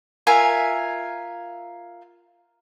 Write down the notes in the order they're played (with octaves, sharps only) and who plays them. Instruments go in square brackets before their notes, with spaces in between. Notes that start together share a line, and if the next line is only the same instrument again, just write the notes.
[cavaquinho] F4 A#4 E5 G#5